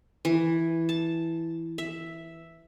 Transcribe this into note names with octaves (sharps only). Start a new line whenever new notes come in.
E3
A5
E5